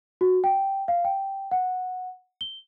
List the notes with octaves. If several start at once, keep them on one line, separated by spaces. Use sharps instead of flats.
F#4
G5
F5
G5
F#5
G7